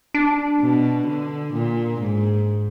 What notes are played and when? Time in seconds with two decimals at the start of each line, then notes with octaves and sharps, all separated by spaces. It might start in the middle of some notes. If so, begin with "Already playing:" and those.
0.14 D4
0.61 B2
1.07 D3
1.53 A#2
2.00 G#2